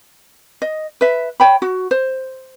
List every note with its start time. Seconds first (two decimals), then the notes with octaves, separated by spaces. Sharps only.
0.62 D#5
1.01 B4 E5
1.40 C#5 G5 B5
1.62 F#4
1.91 C5